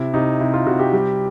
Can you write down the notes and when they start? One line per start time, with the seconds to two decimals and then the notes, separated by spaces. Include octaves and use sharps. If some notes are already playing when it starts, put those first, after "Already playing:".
Already playing: C3 E4
0.14 C3 D#4
0.40 C3 E4
0.54 F4
0.66 C3 F#4
0.79 G4
0.93 G3